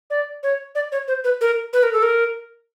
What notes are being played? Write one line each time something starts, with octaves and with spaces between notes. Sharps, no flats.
D5
C#5
D5
C#5
C5
B4
A#4
B4
A#4
A4
A#4